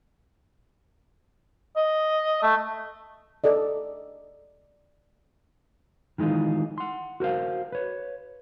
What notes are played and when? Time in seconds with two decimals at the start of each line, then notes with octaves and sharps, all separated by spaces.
1.76 D#5
2.43 A3
3.44 A4 D5 D#5
6.18 D#3 E3 G#3 D#4 F4
6.78 F#5 C6
7.20 F#4 A#4 C5 F5
7.72 B4 C#5